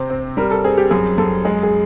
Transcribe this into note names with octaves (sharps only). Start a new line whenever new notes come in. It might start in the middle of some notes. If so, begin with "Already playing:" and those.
Already playing: C3 C4 C5
C4
G3 A#4
A4
C4 G#4
G4
F#2 G#4
F#2 A4
G#3 G#4
G#4